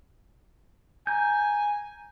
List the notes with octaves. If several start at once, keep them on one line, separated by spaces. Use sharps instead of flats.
G#5 A#5 G6